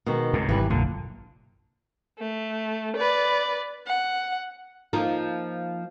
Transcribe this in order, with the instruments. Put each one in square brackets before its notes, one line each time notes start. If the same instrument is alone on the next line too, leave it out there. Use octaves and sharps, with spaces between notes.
[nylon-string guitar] B2 D#3 G#3
[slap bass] C#2 G#2 C3
[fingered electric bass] G#1 [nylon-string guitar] E3 G3 B4
[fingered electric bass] F#1 B1 [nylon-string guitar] A#2 [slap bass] D3
[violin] A3
B4 D5
F#5
[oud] F3 A#3 D#4